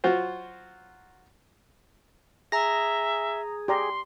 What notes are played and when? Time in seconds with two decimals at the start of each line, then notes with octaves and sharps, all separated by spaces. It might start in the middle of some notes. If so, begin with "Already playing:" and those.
0.04 F#3 F4 F#4 C5
2.52 G#4 E5 A#5 A#6
3.68 G4 D5 A#5 C6